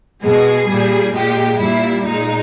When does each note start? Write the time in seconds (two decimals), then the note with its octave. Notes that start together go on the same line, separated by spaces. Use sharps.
0.23 B2 G#3 G#4
0.68 G3
0.73 A#2
1.14 A#2 G#3 G4
1.59 A#2 G3 E4
2.05 A#2 G#3 D#4